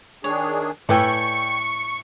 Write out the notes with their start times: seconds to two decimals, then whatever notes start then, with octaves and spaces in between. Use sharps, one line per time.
0.24 D#3 D4 G#4 C#5
0.89 A2 B4 D5 G5 G#5 C#6 E6